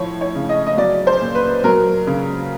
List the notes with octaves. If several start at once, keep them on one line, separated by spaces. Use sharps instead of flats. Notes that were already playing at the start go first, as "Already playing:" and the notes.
Already playing: A2 F3 C#5
C#5
C#3
D#5
D#5
F#3 D5
C5
A#2
B4
F#3 A#4
C#3